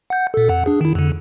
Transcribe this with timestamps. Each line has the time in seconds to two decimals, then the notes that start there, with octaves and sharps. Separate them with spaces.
0.10 F#5 G6
0.34 A#2 A4
0.49 F2 F#5
0.66 D4 G#4
0.81 D#3 E4
0.95 F2 D3